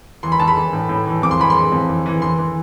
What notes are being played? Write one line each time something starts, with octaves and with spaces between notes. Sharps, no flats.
E3 C6
B5
E3 A5
B5
E3
A2
A2
E3
F2 D6
C6
E3 B5
C6
E3
F2
E3
E3
E3 C6
E3